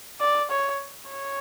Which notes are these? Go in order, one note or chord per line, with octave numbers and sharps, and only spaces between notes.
D5
C#5
C#5